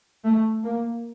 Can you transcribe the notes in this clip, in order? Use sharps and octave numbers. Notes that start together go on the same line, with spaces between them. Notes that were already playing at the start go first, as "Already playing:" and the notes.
A3
A#3